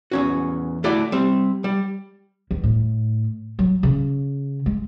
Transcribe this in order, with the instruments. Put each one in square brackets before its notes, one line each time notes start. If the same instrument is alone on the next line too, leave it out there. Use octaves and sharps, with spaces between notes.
[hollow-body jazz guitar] E2 C#4 F#4
A3 E4 F#4 A4 D5
G3 C4
G3
[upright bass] E2
A2
F#3
C#3
G#3